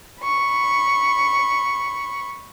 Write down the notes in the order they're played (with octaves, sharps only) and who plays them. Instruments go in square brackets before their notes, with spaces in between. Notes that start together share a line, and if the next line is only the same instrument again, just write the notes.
[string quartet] B5 C#6